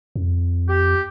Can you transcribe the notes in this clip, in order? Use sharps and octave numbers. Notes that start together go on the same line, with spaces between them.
F2
G4